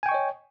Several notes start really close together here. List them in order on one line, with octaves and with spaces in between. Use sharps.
G#5 G5 C#6 D#5 C#5